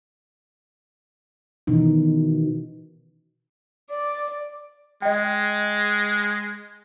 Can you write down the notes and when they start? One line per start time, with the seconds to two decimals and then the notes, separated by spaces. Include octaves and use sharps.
1.67 B2 D#3 E3 C#4 D#4
3.88 D5
5.02 G#3 D#5 G5